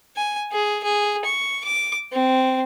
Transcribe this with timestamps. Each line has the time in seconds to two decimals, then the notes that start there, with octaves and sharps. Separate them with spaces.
0.16 G#5
0.52 G#4
0.83 G#4
1.25 C#6
1.65 D6
2.13 C4